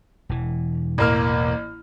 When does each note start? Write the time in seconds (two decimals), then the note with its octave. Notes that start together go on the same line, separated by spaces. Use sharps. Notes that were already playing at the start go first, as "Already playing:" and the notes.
0.29 E1 E3
0.98 A1 A#3 F6